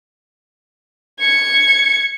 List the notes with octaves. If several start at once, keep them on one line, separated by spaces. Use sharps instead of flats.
G#6 C#7